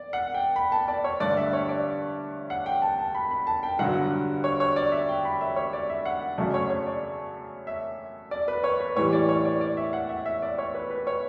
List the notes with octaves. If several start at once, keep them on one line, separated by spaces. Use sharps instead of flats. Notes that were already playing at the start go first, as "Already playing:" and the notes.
Already playing: D5
F#5
G5
B5
A5
D5
C#5
G2 D3 A3 D5
E5
C#5
D5
F#5
G5
A5
A5
B5
B5
A5
G5
G2 D3 F#3 F#5
C#5
C#5
D5
E5
G5
B5
E5
C#5
D5
E5
F#5
F#2 C#3 F#3 A3 D5
C#5
C#5
D5
E5
D5
B4
C#5
B4
A2 E3 G3 C#5
D5
C#5
D5
D5
E5
F#5
E5
E5
D5
C#5
B4
B4
C#5